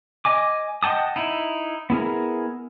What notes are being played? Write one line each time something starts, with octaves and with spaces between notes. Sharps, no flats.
D#5 G#5 D6
D#5 F#5 G5 A5 D#6
D#4 E4
B3 E4 G#4 A#4